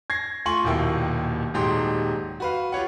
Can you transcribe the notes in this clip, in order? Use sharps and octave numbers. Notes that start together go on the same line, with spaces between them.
G#6 A#6 C7
A3 F4 G#5 C6 C#6 F#7
D#1 D#2 B2 A#3 E4 G5
D#1 G#2 F#3 G4 G#4 C6
F#4 B4 F5
F4 G4 C#5 F#5